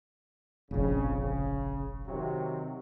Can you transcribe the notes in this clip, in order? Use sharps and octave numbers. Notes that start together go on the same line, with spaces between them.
F1 A#1 F2 C#3
C#3
C3 D#3 F#3